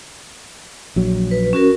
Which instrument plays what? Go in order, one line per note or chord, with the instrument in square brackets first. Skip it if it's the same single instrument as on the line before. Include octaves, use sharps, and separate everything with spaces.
[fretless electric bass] A#1 F#3
[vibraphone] B4
C#4 F#4 A#4